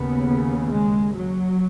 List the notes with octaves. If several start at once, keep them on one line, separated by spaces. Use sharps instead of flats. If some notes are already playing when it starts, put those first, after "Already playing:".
Already playing: D#2 C#3 B3
G#3
F#3